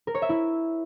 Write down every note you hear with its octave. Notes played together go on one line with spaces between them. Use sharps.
A#4
C#5
E5
E4